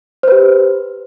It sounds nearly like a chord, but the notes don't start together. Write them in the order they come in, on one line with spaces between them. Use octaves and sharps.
C5 B4 G4